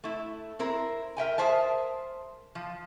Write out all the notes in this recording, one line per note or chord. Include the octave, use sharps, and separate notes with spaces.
A3 E4
C4 E4 A#4
A#4 E5 G5 G#5
G#4 A#4 C5 E5 A5
F3